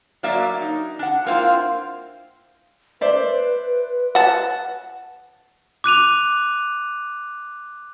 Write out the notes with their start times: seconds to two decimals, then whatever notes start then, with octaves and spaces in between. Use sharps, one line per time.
0.23 F#3 A#3 D4 D5 E5
0.62 D#4
0.99 D4 F#5
1.26 A#3 C4 E4 F4
3.01 B4 C5 D5 E5
4.15 F#5 A5
5.84 D6 F#6 D#7 F7